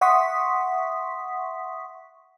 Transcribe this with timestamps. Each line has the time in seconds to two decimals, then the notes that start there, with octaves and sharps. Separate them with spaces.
0.01 E5 F#5 C6 C#6 D#6 B6